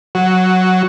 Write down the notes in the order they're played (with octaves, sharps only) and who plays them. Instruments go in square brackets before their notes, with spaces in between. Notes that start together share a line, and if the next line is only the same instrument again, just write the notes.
[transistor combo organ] F#3